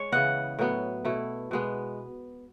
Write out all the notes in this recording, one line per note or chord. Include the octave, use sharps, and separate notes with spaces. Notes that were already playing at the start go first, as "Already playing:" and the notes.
Already playing: G#3 C#5
C#3 E3 B3 D#5 F#5
A2 F#3 B3
B2 A3 E4
B2 G#3 B3